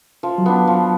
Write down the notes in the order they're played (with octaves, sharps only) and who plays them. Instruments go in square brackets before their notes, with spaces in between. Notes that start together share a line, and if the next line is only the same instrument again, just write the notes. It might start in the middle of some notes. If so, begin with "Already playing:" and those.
[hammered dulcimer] F3
[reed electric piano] F#3
[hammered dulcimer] B3 D4
F3